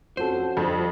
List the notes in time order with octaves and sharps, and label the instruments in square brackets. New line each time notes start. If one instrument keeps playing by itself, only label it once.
[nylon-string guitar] F2 C#4 A4 [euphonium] F#4 [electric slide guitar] C5
[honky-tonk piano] F2 [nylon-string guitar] G3 D4 A4